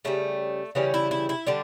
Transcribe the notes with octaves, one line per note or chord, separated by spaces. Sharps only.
C#3 G3 A3
C#3 E3 G3 C#4
E4
E4
E4
D3 G3 D4